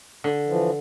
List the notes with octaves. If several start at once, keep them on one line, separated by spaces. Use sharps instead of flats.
D3
E3 F3